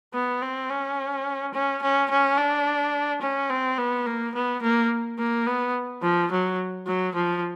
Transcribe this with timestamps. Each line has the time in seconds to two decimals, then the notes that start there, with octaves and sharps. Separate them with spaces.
0.14 B3
0.41 C4
0.69 C#4
1.54 C#4
1.82 C#4
2.10 C#4
2.37 D4
3.22 C#4
3.50 C4
3.78 B3
4.06 A#3
4.35 B3
4.62 A#3
5.19 A#3
5.47 B3
6.02 F3
6.31 F#3
6.87 F#3
7.15 F3